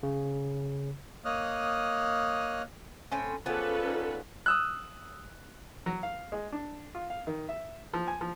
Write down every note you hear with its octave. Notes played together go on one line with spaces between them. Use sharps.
C#3
A#3 C#5 D#5 D#6 F6 F#6
A2 C4 C#4
F3 G#3 B3 C#4 A4 B4 D5 G#5
D#4 D#5
D#6 E6 F#6
F#3
F5
G#3
D4
F4
F5
D#3
E5
F3
G#5
F3